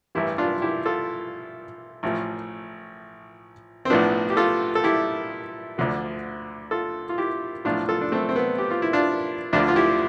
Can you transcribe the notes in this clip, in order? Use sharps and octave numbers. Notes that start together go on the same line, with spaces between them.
A1 G2 E3 E4 G4
D4 F4
E4 G4
F4 A4
A1 A2 F3
C4
B1 A2 F3 B3 D4
G4
F4 A4
A4
E4 G4
D2 D3 F3
F4 A4
F4
E4 G4
B1 A2 F3 D4 F4
F4 A4
D4
A3 C4
C4
B3
G4
F4
E4
D4 F4
D2 D3 F3 D4 F4
F4
E4 G4